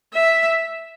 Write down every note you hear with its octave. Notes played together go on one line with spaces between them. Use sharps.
E5